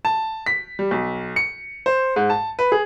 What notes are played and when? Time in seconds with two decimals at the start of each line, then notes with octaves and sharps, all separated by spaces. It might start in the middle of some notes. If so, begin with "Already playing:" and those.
0.05 A5
0.46 B6
0.79 G3
0.91 B1
1.36 C#7
1.86 C5
2.16 G#2
2.30 A5
2.59 B4
2.72 G#4